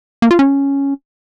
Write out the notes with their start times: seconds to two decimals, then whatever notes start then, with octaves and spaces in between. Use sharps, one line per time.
0.22 A#3
0.31 F4
0.39 C#4